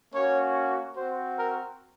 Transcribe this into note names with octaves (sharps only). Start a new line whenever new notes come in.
A#3 C#4 F#4 C#5
C4 F#4 C5
A#4